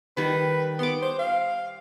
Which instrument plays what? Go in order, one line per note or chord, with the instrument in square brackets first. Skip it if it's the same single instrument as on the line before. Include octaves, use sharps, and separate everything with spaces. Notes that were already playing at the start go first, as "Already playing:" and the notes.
[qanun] D#3 G3 [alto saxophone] B4
[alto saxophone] B3 [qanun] C6 D6
[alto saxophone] C5
F5